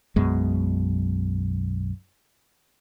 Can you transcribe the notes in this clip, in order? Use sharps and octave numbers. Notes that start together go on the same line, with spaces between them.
B1 F#2 B2 G#3